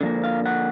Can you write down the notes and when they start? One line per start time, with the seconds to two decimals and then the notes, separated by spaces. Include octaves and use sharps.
0.01 D3 F3 A#3
0.24 F5
0.45 F#5